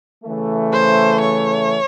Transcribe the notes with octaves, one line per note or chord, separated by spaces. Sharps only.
C#3 E3 A3
C5
C#5